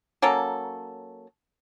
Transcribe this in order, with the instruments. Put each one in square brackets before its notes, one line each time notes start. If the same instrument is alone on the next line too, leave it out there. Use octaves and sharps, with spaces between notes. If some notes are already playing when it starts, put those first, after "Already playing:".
[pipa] F#3 A#3 C#4 A4